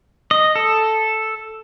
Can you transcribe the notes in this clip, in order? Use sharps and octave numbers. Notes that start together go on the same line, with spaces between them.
D#5
A4